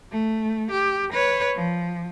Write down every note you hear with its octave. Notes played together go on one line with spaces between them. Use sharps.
A3
G4
B4 C#5
F3